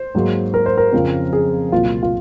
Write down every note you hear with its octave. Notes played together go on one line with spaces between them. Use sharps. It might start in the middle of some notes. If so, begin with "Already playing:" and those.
Already playing: C5
G#2 F#3 A#3
A#4
C5
A#4
F2 C#3 F3 C4
G#4
C2 A#2 F#3 A#3 F4
F4